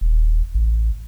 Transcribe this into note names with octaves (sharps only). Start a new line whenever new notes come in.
D#1
A1